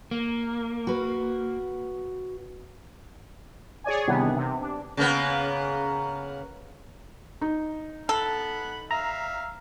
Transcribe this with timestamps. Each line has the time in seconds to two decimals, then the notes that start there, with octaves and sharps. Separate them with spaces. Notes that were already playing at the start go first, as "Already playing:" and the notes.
0.11 A#3
0.87 F#4 B4
3.84 G#4 C#5 D5 G#5
4.07 C3 D#3 E3 G3 B3 D4
4.37 C3
4.61 D4
4.97 C#3 A#3 B3
7.41 D#4
8.09 A4 F#5 B5
8.91 E5 F5 A#5